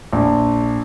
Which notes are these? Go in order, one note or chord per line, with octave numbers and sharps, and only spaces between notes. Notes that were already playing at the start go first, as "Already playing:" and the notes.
A#1